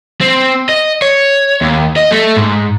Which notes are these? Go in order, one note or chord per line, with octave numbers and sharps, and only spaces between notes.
C4
D#5
C#5
D#2
D#5
A3
G#2